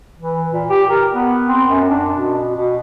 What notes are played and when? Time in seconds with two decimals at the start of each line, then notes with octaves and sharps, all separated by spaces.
0.19 E3
0.53 A#2
0.70 G4
0.89 A#4
1.14 B3
1.48 C4
1.68 F#2
1.90 D4
2.11 B2
2.56 B2